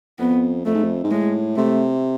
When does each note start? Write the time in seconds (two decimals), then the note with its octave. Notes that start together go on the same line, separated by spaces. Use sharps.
0.19 F2 B3
0.65 F2 A3
0.74 G#2
0.84 F2
1.04 G#2
1.11 A2 G#3
1.56 C3 A3